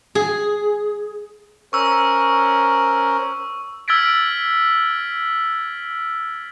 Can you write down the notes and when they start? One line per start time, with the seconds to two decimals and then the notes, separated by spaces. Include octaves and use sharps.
0.15 G#4
1.73 C#4 A#4 C5 C#6 E6
3.88 E6 F6 G#6 A6 B6 D7